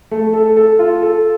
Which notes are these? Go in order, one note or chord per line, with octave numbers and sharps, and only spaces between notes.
A3
A4
A4
F4
A4